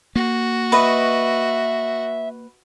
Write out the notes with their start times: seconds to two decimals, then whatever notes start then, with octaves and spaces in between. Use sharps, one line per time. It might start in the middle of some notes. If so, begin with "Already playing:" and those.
0.16 A#3 F#4
0.72 B4 D#5 E5 C#6